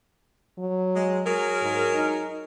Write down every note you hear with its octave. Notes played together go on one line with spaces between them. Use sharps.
F#3
G#3
F#3 G#4 A#4
G#2
D#4